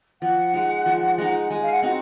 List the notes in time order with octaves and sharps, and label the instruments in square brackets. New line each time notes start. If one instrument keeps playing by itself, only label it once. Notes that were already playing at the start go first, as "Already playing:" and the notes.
[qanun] F3 [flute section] F#5
[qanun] G#3 D#4
F3
G#3 D#4
[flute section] F#5
[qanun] G#3 [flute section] G#5
[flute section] F5
F#5
[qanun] C4 D#4 F#4 [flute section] F#5